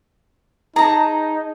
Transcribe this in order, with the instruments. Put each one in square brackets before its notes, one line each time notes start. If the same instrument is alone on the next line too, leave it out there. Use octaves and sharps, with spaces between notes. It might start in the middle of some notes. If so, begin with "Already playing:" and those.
[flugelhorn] D#4 [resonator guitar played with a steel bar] G#4 A5 [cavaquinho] A#5